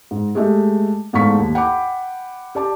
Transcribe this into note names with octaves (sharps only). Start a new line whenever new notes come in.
G#2
G#3 A3 G4 D#5 E5
E2 G#2 A3 F5 C#6 B6
D#2
F#5 G5 B5 D6
G4 D5 A5 D6